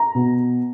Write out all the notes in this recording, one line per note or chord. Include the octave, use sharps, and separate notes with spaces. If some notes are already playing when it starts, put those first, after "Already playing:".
Already playing: A#5
B2